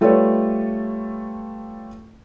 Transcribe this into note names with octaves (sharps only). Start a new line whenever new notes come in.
G3 A3 F4 A4 B4 C#5